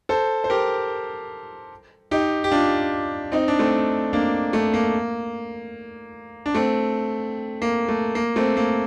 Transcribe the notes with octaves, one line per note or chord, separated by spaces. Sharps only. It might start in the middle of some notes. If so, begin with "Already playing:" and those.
A4 C5
C5
G4 A#4
D#4 G4
G4
D4 F4
C4 D#4
D4
A3 C4
A#3 D4
A3
A#3
D4
A3 C4
A#3
A3
A#3
A3 C4
A#3